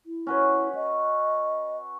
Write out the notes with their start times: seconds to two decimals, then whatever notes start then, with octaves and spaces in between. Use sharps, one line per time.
0.06 E4
0.27 C#4 F#4 B4
0.75 D#5